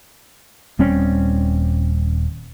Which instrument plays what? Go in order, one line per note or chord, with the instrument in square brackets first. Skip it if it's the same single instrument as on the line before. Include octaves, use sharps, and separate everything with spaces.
[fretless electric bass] D#1 G3 C4 C#4